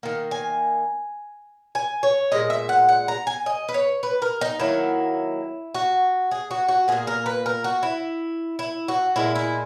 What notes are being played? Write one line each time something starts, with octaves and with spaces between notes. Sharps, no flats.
D#3 A#3
G#5
G#5
C#5
A#2 G#3 D#5
E5
F#5
F#5
A#5
G#5
D#5
B4
C#5
B4
A#4
D#4
D#3 F#3 A#3 E4
F#4
G#4
F#4
F#4
A#2 A#3 G#4
A#4
B4
A#4
F#4
E4
E4
F#4
A#2 G#3 E4
E4